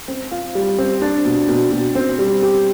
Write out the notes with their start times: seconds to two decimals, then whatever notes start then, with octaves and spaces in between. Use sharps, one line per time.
0.08 C4
0.31 F4
0.55 G3
0.78 C4
1.02 D4
1.25 B2
1.49 B2
1.72 B2
1.95 C4
2.18 G3
2.42 G4